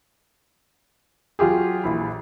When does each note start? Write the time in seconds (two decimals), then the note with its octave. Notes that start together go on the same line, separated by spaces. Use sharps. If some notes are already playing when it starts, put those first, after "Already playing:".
1.39 F#3 F4 G4 G#4
1.84 A#1 E3 B5